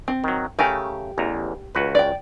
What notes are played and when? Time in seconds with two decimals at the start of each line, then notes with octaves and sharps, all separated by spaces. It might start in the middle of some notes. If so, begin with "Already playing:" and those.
0.08 C4
0.24 D#3 F#3
0.59 C#3 A3 G4 A#4 G#5
1.18 A1 E2 A#5
1.75 C#2 F#4 B4
1.95 D5 G5